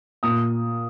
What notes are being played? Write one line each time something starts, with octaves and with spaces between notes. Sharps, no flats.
A#2 D#6